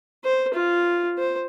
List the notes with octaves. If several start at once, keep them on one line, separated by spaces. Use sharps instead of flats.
C5
F4
C5